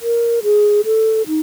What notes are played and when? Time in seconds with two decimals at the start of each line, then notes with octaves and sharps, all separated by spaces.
0.02 A#4
0.44 G#4
0.85 A4
1.28 D#4